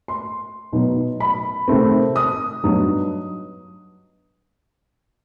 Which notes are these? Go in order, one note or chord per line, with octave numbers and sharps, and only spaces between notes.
C6
B2 F#3 B3 D#4
B5
C3 D#3 A3 C4
D#6
G2 F#3 B3 D#4